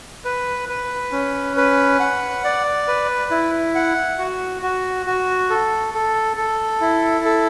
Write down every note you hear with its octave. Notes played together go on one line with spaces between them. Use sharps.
B4
B4
C#4
B4
F#5
D5
B4
E4
F#5
F#4
F#4
F#4
A4
A4
A4
E4
A4